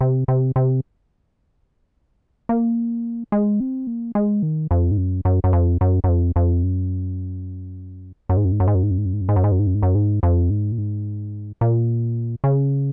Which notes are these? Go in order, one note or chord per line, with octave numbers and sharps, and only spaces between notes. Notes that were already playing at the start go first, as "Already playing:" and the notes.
C3
C3
C3
A#3
G#3
C4
A#3
G#3
D#3
F2
G#2
F#2
F#2
F#2
F2
F#2
F#2
F2
F2
F#2
F#2
G#2
F#2
G#2
F#2
G#2
F#2
G#2
F#2
G#2
F#2
G#2
F#2
G#2
F#2
G#2
F#2
G#2
F#2
G#2
F#2
G#2
F2
G#2
A#2
G#2
A#2
C#3